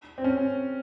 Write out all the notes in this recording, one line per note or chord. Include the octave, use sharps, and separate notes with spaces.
C4
C#4